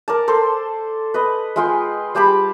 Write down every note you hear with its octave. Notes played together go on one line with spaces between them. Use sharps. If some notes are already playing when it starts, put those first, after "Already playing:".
A#4 D5 A5
A4 C5 C6
B4 D#5
G#3 F4 G5
G3 G4 A5 B5